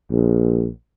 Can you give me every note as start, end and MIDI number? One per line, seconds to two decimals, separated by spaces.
0.11 0.68 34